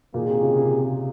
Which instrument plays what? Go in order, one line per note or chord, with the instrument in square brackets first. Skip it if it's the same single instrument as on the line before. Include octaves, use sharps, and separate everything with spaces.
[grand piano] A#2 [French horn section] D#3 A#3 F4 G#4
[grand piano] C3
C#3
C3